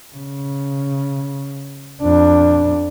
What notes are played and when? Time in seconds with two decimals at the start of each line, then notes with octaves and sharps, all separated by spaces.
0.15 C#3
2.02 F2 D4